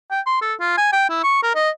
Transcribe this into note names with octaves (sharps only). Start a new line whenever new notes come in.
G5
C6
A4
F4
G#5
G5
E4
C#6
A#4
D#5